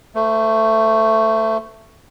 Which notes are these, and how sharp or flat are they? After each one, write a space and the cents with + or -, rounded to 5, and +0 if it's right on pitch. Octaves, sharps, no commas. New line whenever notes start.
A3 +15 C5 -35